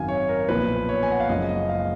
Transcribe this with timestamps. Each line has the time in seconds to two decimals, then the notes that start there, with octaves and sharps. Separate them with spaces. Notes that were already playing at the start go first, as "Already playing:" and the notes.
Already playing: G#1 F#2 D#3 F#3 F5 G#5
0.09 C#5
0.29 A#4
0.48 B1 A#2 F3 B4
0.89 C#5
1.03 G#5
1.12 F#5
1.20 F5
1.29 F#1 F#2 F3 G#3 D#5
1.49 D#5
1.69 F5